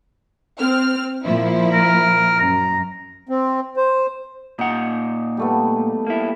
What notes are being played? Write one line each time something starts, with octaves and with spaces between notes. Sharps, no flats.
C4 F6
A#2 F3 E4
A#4
F#2 A#5
C4
C5
A#2 D#4 F#5
G3 A3 B3
A#3 E4